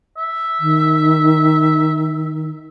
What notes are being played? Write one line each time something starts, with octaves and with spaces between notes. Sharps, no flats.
E5
D#3